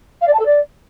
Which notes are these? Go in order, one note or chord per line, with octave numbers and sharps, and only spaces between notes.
F5
D5
A5
A4
D5